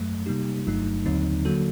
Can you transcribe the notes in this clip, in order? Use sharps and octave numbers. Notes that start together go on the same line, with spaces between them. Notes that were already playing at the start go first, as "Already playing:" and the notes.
Already playing: F#2 F#3 A3
C3 G3 A#3 D#4 G4
G1 G2 F#3 A3 D#4
D#2 D3 F#3 C4 D#4
D3 F#3 A#3 F#4 A4